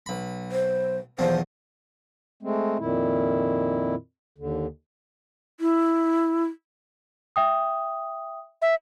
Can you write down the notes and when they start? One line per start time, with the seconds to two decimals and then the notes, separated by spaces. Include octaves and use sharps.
0.06 B1 B5
0.52 C5
1.19 B1 E2 F3 C5
2.43 G#3 A3 C4
2.79 F2 A#2 D#3 E4
4.38 D#2 D3
5.60 E4
7.36 E5 G5 D#6
8.62 E5